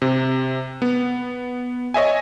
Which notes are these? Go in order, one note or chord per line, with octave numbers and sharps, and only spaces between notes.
C3
B3
C#5 D#5 E5 G#5